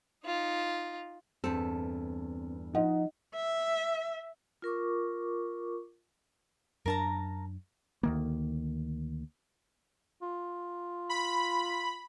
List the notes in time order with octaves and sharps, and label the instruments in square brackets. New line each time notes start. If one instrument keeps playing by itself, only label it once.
[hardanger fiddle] D#4 F4
[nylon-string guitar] E2 G2 A4 [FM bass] C4
[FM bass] F3 [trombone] D#4 [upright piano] D#5 F#5
[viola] E5
[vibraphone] F4 A#4 C#6 D6
[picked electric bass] F#2 D4 [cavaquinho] A#4 A5 A#5
[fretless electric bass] D2 D#3 A#3
[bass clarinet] F4
[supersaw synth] B5